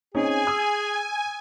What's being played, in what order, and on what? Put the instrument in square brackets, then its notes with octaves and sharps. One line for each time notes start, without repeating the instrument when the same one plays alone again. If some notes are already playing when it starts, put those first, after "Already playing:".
[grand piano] C4 C#4 D#4 [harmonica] G#4 [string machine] G#5
[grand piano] D#6 E6